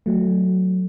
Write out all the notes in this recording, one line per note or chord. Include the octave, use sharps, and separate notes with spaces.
F#3 A3